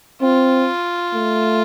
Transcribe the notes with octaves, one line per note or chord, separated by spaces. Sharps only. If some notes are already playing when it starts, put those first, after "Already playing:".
C4 F4
A3